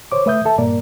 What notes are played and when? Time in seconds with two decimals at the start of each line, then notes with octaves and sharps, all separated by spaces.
0.12 C5 C#5 D6
0.26 A3 B4 E5 D#6 G6
0.45 A4 E5 A5
0.58 G2 A#2 A#3 A#4 D5